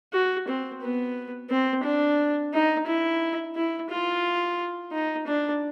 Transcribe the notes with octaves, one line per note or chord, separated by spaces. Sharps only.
F#4
C4
B3
C4
D4
D#4
E4
E4
F4
D#4
D4